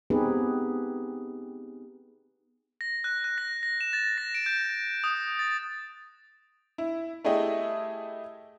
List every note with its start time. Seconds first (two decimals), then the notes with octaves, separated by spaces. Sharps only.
0.10 B3 C4 D#4 G4 G#4 B4
2.81 A#6
3.04 F#6
3.24 F#6
3.38 A#6
3.63 A#6
3.81 E7
3.93 A6
4.18 A#6
4.35 D7
4.46 G6
5.04 D#6
5.39 A6
6.78 E4
7.24 A3 E4 G4 G#4 D#5